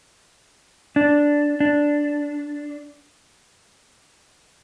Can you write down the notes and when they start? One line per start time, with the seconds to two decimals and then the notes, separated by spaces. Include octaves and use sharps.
0.96 D4
1.60 D4